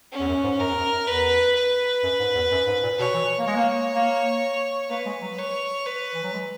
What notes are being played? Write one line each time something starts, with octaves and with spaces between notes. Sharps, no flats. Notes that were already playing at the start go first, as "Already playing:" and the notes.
C#4
E2
F#2
G#2
F#2 A#4
E2
F#2
F#2
E2 B4
B4
F#2
G#2
E2
F#2
G#2
A#2
B2 C#5
E3
A#3
G#3 C#5
A#3
A#3
A#3 B4
G#3
F#3
C#5
B4
E3
F#3
G#3